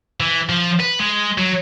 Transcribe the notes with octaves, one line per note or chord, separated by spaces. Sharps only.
E3
F3
B4
G#3
F#3